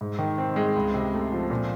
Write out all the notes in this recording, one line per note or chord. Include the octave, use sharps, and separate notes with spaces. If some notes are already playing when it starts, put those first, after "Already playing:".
G#2
D#3
C4
G#3
C#2
C3
A3
F3
A#2